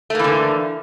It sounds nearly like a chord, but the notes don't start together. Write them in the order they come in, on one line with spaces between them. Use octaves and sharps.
A3 A#3 E3 D3